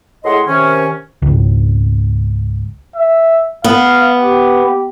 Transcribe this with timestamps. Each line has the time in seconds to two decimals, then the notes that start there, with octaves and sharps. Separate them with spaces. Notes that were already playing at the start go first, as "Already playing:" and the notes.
0.25 A2 G#4 D#5 F#5 C6
0.47 C3 D#3 C#4
1.22 G#1 C#2
2.95 E5
3.64 B3 F5
4.17 G4